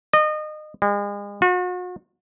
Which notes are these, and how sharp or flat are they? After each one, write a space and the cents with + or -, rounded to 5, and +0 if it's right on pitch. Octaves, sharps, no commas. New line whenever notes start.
D#5 -30
G#3 -40
F#4 -40